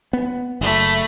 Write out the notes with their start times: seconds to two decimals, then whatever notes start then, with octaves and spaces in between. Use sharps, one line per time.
0.13 B3
0.61 F#1 A3 B5